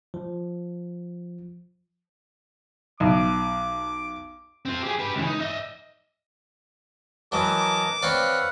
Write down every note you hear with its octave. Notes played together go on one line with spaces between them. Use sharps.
F3
B1 D6
C4 F4
G4 G#4
G4 B4
C#2 E3
D#4
D#5 E5
E3 F#3 A#4 D#5 A5 D6
C4 B4 C#5 D5 F5 F#5